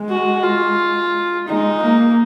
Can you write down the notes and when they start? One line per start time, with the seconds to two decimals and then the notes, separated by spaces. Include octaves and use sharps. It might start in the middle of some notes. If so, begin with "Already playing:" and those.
Already playing: G#3
0.09 F#4
0.43 F4
1.48 G#3 D#4
1.83 A#3